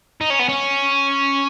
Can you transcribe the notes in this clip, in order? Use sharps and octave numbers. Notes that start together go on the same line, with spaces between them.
D#4
C#4
B3
C#4